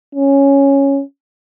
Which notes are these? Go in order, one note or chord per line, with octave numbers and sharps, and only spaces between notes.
C#4